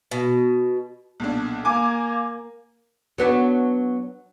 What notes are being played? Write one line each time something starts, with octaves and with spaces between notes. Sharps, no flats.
B2
B1 A#2 D4
A#3 G#5 D6
F#3 B3 D4